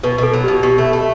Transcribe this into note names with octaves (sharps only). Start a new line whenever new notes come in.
B2 B4
B2 A4
F#3
G4
B2
B2 G4
A3
A3